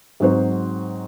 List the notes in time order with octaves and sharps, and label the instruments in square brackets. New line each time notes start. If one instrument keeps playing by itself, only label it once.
[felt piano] G#2 F#3 C4 F#4 C5